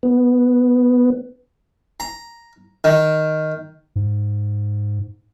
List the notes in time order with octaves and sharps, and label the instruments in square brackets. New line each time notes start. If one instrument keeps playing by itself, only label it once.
[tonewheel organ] B3
[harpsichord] A#5
D#3
[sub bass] G#2